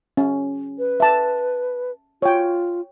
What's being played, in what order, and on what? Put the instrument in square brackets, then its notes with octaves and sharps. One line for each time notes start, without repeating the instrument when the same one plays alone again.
[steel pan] C#4
[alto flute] B4
[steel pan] E5 A5
[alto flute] F4 [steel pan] C#5 G5